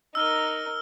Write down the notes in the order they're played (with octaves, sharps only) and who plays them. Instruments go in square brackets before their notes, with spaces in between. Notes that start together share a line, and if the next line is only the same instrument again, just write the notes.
[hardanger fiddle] D#4 A#4 [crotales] E6 F6 G7